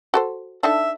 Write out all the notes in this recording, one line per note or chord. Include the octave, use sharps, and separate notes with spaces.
F#4 A4 C5
D4 D#4 A4 E5